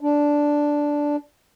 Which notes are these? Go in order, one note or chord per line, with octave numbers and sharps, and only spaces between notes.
D4